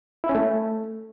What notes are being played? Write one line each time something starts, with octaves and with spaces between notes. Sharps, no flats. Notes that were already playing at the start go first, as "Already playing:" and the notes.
E4
C#4
A3